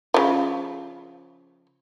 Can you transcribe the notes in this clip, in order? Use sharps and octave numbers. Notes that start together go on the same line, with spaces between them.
C#3 F3